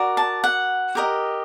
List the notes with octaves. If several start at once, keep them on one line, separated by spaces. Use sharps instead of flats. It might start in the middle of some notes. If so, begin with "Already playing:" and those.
Already playing: F#4 A#4 D5
A5
F#5
G4 A#4 D#5